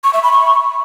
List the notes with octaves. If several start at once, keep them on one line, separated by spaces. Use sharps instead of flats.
C#6
E5
B5
C#6